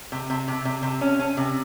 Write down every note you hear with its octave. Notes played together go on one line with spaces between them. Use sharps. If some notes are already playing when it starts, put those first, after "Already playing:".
C3
C3
C3
C3
C3
C#4
C#4
C3